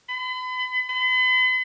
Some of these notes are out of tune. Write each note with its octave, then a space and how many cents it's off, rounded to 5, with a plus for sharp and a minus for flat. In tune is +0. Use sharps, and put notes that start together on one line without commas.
B5 +40
B5 +45